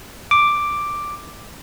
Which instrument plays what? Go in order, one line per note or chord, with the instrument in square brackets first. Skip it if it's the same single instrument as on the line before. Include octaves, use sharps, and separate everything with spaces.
[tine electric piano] D6